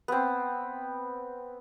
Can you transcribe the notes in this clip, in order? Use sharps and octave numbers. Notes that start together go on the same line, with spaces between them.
B3 C4